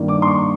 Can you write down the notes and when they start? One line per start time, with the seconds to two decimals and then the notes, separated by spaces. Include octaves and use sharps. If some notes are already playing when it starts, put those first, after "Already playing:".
Already playing: G2 D#3 G3 A#3
0.08 D6
0.22 C6
0.28 C#6